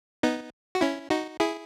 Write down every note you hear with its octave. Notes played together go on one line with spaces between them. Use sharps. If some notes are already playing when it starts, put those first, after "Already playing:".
B3 D#4
F#4
C#4 E4
D#4 F#4
E4 G#4